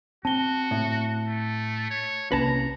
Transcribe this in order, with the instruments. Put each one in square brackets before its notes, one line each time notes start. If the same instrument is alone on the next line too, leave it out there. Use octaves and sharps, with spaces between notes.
[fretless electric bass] C4 [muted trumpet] F#4 [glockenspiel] A5 G7
[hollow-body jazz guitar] A2
[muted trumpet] A3
C#5
[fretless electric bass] C2 A#3 C#4 [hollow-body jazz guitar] B4 A5 [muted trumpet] A#5